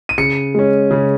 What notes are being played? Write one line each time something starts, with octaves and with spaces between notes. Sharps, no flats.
D#7
C#3 C#7
G#3 C#4
C#3